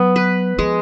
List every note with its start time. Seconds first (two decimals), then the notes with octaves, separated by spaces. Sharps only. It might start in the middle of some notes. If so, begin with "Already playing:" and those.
Already playing: F#3 B3
0.16 B4
0.58 F3 G#3